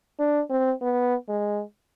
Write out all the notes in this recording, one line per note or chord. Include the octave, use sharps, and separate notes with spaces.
D4
C4
B3
G#3